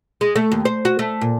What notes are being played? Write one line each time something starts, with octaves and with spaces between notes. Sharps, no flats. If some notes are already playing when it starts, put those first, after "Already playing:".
G#3
A3
D#2
C5
F#4
A3
A#2